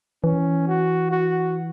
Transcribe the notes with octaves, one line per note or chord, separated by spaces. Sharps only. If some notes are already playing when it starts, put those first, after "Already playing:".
E3 C#4
F#4
F#4